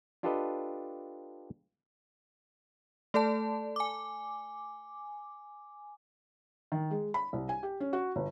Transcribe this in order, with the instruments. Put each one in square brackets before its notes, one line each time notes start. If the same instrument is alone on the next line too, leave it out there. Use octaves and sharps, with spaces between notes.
[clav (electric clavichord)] D4 F4 G4 A4 B4 D#5
[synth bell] A3 A4 D5 A5
G#5 D6
[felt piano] D#3
G#3
B5
C2
G#5
G4
C#4
F#4
G1